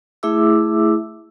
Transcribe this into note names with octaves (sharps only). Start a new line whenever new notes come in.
A3 E4 G#4 E5 D6 E6